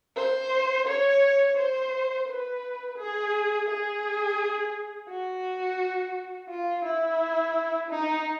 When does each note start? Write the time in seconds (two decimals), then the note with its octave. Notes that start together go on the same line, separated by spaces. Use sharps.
0.16 C5
0.87 C#5
1.57 C5
2.27 B4
2.98 G#4
3.68 G#4
5.09 F#4
6.49 F4
6.85 E4
7.90 D#4